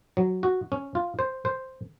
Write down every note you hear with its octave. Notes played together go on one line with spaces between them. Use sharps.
F#3
F#4
C#4
F4
C5
C5